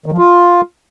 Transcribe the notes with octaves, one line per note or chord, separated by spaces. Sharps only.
D#3
F3
F4